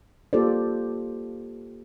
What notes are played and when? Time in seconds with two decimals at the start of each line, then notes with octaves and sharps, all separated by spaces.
0.33 A#3 F4 G4 A4 C5 D5